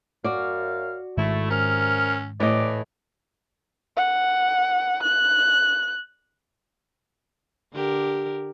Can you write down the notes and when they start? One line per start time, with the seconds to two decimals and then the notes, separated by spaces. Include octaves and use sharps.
0.24 F#2 F#4 D5 F5
1.18 G#2 D#3 G#3 A3 E4
1.50 C3 C#4 A#4 F6
2.40 A2 E3 G3 D5 D#5 D6
3.97 F#5
5.03 F#6
7.73 D3 G4 A#4